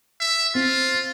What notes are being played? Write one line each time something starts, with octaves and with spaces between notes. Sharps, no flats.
E5
C4 F4